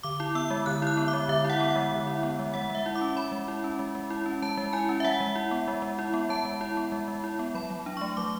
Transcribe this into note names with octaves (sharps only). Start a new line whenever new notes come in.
D3 D6
E4
B3 E6
G#3
D3 F#6
E4 F#6
B3
D6
G#3
D3 E5
E4 F#5
B3
G#3 F#5
D3
E4
B3
G#3
G#3 F#5
G#3 E5
E4
D6
C#4
G#3 B5
G#3
E4
C#4
G#3
G#3
E4
C#4
G#3 A5
G#3
E4 G#5
C#4
E5
G#3 F#5
G#3
E4
B3
G#3
G#3
E4
B3
G#3 A5
G#3
E4
B3
G#3
G#3
E4
B3
F#3 B5
F#3
D4
A3 C#6
F#3 D6